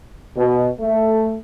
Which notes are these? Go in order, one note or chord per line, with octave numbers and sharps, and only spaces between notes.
B2
A3